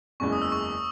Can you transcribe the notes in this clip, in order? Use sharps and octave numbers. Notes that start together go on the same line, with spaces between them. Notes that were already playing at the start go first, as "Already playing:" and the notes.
F#1 E2 C#3 E3 G#3 C#6
D#6
E6
C#6